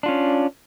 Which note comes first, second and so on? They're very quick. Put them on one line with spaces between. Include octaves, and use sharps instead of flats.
D4 F4 C#4